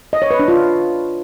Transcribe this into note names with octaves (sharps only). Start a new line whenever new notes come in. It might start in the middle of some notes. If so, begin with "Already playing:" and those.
D#5
C#5
B4
D4
F4